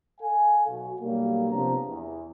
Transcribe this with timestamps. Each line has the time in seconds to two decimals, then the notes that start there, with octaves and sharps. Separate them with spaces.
0.20 A4 F5 G#5
0.67 B1 F#4
1.00 B1 F#3 G3 A#3
1.50 C3 F3 B3 D4 A#5
1.86 E2